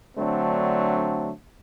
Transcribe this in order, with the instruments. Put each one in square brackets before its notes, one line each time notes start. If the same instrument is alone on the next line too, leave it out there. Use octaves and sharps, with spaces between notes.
[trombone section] D3 F#3 A3 C4 D4